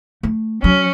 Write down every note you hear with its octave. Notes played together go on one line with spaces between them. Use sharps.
A3
F#3 C#4